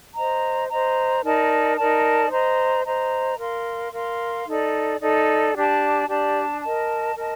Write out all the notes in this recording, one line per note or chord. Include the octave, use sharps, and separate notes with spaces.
C5 D#5 A#5
C5 D#5 A#5
D#4 A#4 D5 A5
D#4 A#4 D5 A5
C5 D#5 A#5
C5 D#5 A#5
A#4 F5 C6
A#4 F5 C6
D#4 A4 D5
D#4 A4 D5
D4 G4 D5 A5
D4 G4 D5 A5
A#4 D#5 A5
A#4 D#5 A5